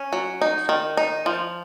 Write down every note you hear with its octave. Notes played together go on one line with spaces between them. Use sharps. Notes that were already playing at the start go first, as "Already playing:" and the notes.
Already playing: C#4
F#3
D#4
D#3
D#4
F3